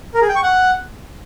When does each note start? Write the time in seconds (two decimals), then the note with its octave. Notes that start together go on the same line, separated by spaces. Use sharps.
0.14 A#4
0.21 G#4
0.29 G5
0.36 C#6
0.43 F#5